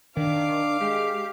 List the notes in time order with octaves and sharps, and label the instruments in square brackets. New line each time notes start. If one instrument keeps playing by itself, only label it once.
[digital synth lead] D#3 [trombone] D4 [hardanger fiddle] F5 D6
[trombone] G#3 [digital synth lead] G4